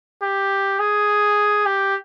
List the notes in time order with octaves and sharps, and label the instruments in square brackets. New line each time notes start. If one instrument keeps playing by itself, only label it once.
[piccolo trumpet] G4
G#4
G4